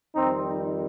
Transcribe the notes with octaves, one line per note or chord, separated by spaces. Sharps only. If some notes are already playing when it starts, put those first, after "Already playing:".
F2 D#3 G3 C4 D#4